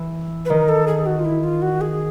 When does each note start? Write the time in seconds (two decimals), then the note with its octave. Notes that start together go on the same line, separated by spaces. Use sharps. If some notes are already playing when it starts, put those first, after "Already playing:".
Already playing: E3
0.45 B4
0.50 D#3 A#4
0.69 A4
0.87 G#4
1.06 F#4
1.19 F4
1.25 E4
1.43 F4
1.62 F#4
1.81 G#4